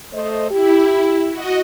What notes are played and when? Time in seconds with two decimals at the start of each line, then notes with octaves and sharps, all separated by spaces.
0.13 A3 C5 D#5
0.51 E4 G4
1.30 F#4 D#5